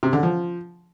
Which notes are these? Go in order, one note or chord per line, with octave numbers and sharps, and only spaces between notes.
C3
D3
F3